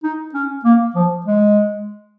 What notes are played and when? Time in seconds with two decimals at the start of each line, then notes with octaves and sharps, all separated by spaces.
0.03 D#4
0.34 C#4
0.65 A#3
0.95 F3
1.26 G#3